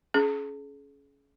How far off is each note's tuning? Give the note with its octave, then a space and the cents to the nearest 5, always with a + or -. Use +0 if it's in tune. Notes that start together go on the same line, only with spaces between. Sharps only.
C#4 +10 G#4 +40